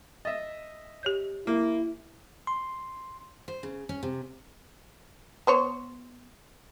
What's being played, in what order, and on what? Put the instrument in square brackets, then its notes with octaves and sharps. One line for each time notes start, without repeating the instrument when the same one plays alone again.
[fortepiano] D#5 E5 [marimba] A6
[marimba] G4 C#5 G6
[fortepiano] A#3 [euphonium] E4
[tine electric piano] C6
[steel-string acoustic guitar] C5
C#3
C#4
C3
[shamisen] B3 C5 C#5